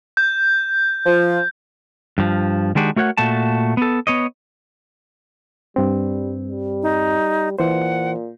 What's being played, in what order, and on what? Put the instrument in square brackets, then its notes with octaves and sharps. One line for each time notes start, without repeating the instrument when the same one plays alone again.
[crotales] G6
[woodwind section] F3
[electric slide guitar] G2 F3
D#3 G#3 D4 F#4 G4
A3 F#4 A#4 C#5 F#5
A#2 A3 F#4 A5
B3 A4
B3 C#5 D#5
[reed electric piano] G2 C4 [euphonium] G3
[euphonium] G3
[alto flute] D#4
[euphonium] A#2 [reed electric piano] E3 C5 [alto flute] F#5